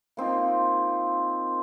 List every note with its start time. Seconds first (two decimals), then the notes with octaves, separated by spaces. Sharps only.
0.17 A#3 C4 D#4 F4